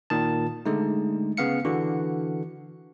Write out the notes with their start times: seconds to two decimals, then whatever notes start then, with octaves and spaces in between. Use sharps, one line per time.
0.10 A#2 D#3 A5
0.66 D3 G#3 A3 D#4
1.37 C#3 B3 F5 C#7
1.65 D3 E3 F#4